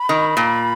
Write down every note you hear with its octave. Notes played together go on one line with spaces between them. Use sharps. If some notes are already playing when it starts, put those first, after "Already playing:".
Already playing: B5
D#3
A#2